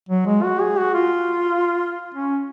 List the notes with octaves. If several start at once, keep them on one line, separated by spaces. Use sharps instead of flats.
F#3
G#3
F#4
G#4
F#4
F4
C#4